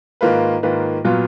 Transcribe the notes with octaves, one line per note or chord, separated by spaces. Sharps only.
G#2 D#3 A#3 F4 B4
G#2 D#3 A#3 F4 B4
A#2 F#3 B3 F4